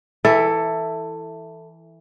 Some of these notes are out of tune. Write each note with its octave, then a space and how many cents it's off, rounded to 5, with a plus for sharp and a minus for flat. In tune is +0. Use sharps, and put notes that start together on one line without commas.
E3 -5 E4 +0 A4 +15